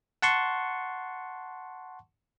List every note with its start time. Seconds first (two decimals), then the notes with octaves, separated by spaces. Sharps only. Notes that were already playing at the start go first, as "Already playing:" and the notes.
0.22 F#5 A5 C6 C#6